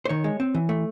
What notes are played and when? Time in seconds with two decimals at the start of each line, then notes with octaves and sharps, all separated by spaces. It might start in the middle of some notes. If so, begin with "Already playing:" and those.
0.05 C5
0.09 D#3 C#5
0.24 G#3
0.40 C4
0.54 E3
0.69 A3